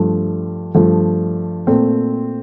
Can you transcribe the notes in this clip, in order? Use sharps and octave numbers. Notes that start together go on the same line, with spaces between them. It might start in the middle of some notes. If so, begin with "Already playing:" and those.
Already playing: G2 F3 A3
G2 F3 A3
A#2 A3 C4